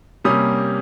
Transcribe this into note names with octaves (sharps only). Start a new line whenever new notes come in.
C3 G3 A#3 C#4 D#6